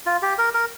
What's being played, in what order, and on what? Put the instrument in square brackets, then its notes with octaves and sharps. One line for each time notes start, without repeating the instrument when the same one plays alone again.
[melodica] F4
G4
A#4
A#4